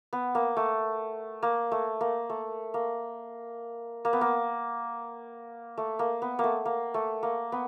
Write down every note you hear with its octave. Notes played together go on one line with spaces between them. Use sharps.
B3
A#3
A3
A#3
A3
A#3
A3
A#3
A#3
B3
A#3
A3
A#3
B3
A#3
A3
A#3
A3
A#3
B3